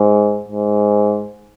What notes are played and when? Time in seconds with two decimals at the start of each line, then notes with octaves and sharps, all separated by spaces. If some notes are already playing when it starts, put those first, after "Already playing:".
Already playing: G#2
0.49 G#2